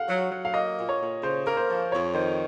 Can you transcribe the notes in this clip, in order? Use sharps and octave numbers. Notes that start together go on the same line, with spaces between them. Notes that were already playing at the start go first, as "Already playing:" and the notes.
Already playing: F5 F#5
F#3
F#3
F5
A#3 D#5
A#2
C#5
A#2
C#3 C5
A#3 A#4
C5
F3
F2 C#5
D#3 C5